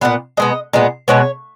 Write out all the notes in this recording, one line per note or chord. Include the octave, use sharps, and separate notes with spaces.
A#2 F#3 B3 F#5
B2 G#3 B3 D#5
A#2 G#3 B3
B2 G#3 B3 C#5